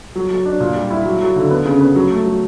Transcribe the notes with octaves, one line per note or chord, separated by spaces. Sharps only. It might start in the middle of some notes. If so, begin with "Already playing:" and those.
F#3
F#3
D4
A#2
G3
E4
F#3
F#3
D3
B3
C#3
B3
F#3
A3
F#3